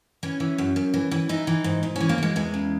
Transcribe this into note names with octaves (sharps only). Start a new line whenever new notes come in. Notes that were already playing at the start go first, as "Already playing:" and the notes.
E3 C#4
E3
F#2
F#2
E3
E3
E3 D#4
E3
G#2
G#2
E3 C#4
A#3
E3 G#3
E2 G#3
C#3